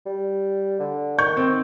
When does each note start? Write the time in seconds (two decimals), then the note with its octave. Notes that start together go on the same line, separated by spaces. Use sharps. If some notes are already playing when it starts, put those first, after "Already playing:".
0.06 G3
0.80 D3
1.19 D#3 C#6 G6
1.37 C4